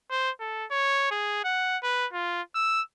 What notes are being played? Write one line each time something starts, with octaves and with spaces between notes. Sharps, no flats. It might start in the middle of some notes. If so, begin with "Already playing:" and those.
C5
A4
C#5
G#4
F#5
B4
F4
E6